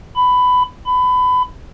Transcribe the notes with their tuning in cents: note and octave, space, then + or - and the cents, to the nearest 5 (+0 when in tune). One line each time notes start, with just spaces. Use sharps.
B5 +15
B5 +25